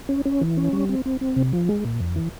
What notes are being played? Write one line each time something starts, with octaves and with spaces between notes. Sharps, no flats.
C#4
C#4
E3
C#4
G3
C4
C4
C4
C3
F3
G#3
A#2
F2
E3